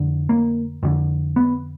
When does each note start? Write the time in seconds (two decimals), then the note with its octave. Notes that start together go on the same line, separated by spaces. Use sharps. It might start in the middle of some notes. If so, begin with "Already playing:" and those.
Already playing: F2 D3
0.29 A#3
0.83 F2 D3
1.36 B3